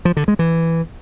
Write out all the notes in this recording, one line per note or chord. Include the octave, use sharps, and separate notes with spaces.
F3
D3
G#3
E3